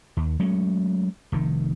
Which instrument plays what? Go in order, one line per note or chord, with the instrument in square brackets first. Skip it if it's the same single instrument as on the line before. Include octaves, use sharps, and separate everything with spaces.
[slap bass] D#2
F#3 G#3 A3 C#4
F1 D#3